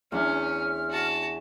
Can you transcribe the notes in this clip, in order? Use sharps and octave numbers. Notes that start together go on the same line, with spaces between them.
E2 C#4 D4 F6
F#4 A5